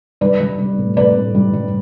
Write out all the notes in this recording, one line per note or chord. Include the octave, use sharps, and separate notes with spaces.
G3 B4 D5
G3
G3
A2
A2 B4 D5
A2
G3
G3